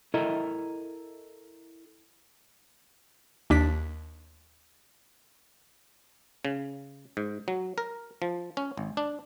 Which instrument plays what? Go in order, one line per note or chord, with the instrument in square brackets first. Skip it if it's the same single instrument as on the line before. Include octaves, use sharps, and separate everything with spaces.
[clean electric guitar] E4 A4 A#4 D#5 E5
[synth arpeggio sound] D#2 D4 B6
[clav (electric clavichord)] C#3
G#2
F#3
A#4
F3
C#4
G#1
D4